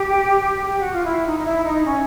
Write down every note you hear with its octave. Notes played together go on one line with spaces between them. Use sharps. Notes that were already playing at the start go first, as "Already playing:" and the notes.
Already playing: G4
G4
F#4
F4
E4
D#4
D#4
E4
D#4
C#4